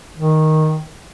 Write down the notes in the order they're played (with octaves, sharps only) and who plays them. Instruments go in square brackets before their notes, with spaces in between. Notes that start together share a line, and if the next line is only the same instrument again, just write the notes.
[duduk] D#3